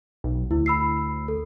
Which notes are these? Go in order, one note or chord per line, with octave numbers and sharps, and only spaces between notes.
B1
D2 E4
B5 E6 C7
A4